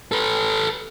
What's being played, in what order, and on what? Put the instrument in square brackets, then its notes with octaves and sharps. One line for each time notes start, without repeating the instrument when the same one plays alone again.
[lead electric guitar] A4 B4